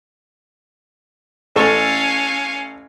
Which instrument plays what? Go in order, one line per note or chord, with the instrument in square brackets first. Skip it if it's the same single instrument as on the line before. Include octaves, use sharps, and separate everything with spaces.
[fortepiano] A1 A4 C#6 [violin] C#4 F5